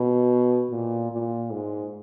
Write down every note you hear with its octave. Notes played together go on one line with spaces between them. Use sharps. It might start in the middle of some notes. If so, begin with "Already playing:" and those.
Already playing: B2
A#2
A#2
G#2